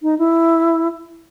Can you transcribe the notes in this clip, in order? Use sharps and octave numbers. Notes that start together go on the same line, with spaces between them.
D#4
E4